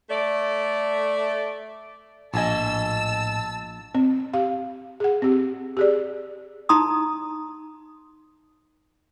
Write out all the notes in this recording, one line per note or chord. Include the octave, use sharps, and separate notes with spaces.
A3 D5
A#1 A2 D#5 G#5 A5 E6
C4
G4 F5
G#4 F#5
C4 G4
G4 G#4 D5
D#4 A5 A#5 C6 D#6